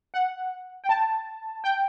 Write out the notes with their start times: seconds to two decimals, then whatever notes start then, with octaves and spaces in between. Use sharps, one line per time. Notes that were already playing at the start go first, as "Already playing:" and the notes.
0.14 F#5
0.84 G5
0.89 A5
1.64 G5